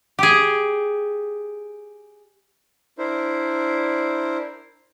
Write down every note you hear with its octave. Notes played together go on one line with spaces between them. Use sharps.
G4 G#4
D4 E4 A#4 C5